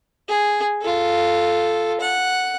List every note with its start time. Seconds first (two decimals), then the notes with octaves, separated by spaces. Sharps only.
0.29 G#4
0.81 F4 A4
2.00 F#5